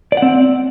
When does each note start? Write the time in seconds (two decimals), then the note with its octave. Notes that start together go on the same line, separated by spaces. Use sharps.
0.12 D5
0.17 F#5
0.22 C4